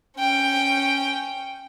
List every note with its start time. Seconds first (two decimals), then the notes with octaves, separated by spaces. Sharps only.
0.17 C#4 G5